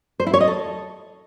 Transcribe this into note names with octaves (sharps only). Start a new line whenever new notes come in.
C5
E4
C#5
D#5
A4